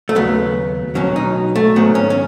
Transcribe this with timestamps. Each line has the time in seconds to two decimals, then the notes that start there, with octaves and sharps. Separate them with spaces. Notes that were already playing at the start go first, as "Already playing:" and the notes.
0.09 A3
0.15 D#2 C#3 F#3 B3
0.95 B1 B2 F#3 C#4
1.16 D#4
1.56 A3
1.76 G#2 D#3 F#3 B3
1.95 C#4
2.10 C#4